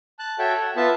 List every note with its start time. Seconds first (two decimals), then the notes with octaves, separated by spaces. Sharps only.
0.19 A5 F#6
0.39 F#4 A4 C#5 E5 G5
0.61 F#5
0.76 B3 F4 E5 A5